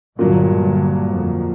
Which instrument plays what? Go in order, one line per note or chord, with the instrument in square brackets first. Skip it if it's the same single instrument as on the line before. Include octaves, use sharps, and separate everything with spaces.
[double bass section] G1 G2 [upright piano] A#2 F#3 A#3
[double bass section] F2